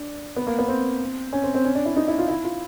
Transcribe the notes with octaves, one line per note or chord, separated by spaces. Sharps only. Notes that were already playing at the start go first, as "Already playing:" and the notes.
Already playing: D4
B3
A#3
B3
C4
C#4
C4
C4
C#4
D4
E4
D#4
E4
F4
E4
F4